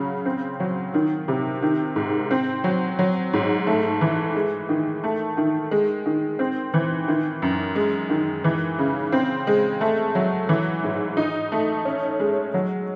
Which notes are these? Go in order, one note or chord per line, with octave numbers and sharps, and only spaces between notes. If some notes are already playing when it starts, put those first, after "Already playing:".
Already playing: C#3 F#3
C4
F#3
D#3
C3
D#3
G#2
C4
F#3
F#3
G#2
A3
E3
G#3
D#3
A3
D#3
G#3
D#3
C4
E3
D#3
F#2
G#3
D#3
E3
C#3
C4
G#3
A3
F#3
E3
G#2
D#4
A3
C#4
G#3
F#3